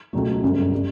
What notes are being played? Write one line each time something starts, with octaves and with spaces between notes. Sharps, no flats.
C#2 B2 F#3 A3
G1 F#2 C#3 G3
C#3 G3